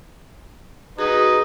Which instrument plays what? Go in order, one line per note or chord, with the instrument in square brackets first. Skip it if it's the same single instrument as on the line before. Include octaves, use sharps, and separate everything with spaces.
[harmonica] D#4 B4 [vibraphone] F#4 G#4